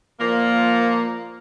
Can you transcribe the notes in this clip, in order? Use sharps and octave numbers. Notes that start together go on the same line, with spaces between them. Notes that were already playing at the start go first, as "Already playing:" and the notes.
A#2 F3 A#3